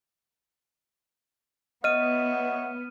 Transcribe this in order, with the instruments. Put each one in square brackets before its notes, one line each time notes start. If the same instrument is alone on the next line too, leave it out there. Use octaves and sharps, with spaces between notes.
[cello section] B3 [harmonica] C#5 E5 F#5 [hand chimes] D#5 [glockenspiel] F6 D#7